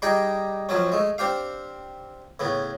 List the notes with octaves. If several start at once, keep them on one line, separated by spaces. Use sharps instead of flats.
G3 D#4 G4 G#4 D5 G5
F2 F3 F#3 C#4
G#3 A3
C4 D4 G4 F5
A2 C#3 B3